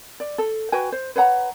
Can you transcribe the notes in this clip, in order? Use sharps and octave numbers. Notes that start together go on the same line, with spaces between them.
D5
A4
F#4 B4 G5 G#5
C5
B4 C#5 F#5 A#5